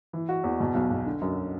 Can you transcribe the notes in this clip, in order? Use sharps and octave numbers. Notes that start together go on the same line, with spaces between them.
E3
F#4
E2
B2
B1
B1
D3
F#2